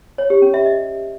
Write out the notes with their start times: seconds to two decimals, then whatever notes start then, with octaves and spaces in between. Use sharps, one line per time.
0.18 C#5
0.30 G4
0.42 C#4
0.54 E5
0.66 D#5